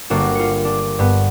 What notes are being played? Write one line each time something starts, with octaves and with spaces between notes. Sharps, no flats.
G1 A#3 D4 F#4
F4 C#7
D4
G2 B3